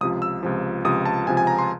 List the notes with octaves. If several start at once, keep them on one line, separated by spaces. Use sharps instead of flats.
C#2 C3 F3 D#6
E6
C#2 C3 F3
C#2 C3 F3 D#6
A5
C#2 C3 F3 G#5
G#5
A#5
C6